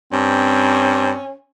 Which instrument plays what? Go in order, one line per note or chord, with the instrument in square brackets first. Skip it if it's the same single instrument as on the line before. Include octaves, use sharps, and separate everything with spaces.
[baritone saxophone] G2 [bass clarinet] C4 [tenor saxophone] C#4